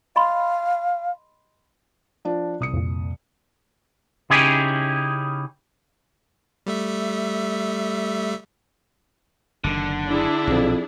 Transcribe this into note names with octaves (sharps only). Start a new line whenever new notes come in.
D#5 F5 B5 C6
F3 D4
C2 D#6 C#7
F2 A#2
C#3 C#4 D#4 E4 G4 G#4
G3 A3 E5
F#1 D3 D#3
D4 E4 G#4
B1 F2 A#2